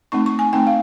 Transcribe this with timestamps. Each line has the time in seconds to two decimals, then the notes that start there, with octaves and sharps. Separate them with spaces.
0.12 A3 C4 D#4 C#6
0.26 C#6
0.39 G#5
0.53 A3 C4 D#4 G5
0.67 F5